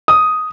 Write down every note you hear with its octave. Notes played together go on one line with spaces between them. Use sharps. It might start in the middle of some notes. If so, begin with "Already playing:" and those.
D#6